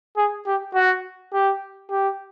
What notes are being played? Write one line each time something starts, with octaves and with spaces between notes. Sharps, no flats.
G#4
G4
F#4
G4
G4